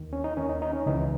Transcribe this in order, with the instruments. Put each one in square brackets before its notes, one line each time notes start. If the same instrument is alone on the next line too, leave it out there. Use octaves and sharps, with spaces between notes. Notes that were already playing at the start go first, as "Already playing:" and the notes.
Already playing: [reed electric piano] D#2 D#3
C#4
D#4
D#2 D#3 C#4
D#4
D#4
C#4
C#2 C#3 E3 D#4